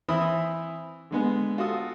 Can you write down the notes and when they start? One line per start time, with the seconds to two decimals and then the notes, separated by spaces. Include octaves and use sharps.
0.08 E3 C4 E4 E5 B5 D#6
1.11 D3 G#3 B3
1.58 F4 F#4 A4 D#6